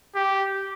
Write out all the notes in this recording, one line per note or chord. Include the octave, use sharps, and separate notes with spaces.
G4